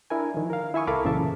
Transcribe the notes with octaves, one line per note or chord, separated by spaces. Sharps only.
D4 E4 A#4 G#5
D#3 F3
A#4 F5
E4 E5 G#5 C#6 D#6
C2 A4 A#4 F5 B5 D6
F#2 A#2 C#3 E3 E5 A5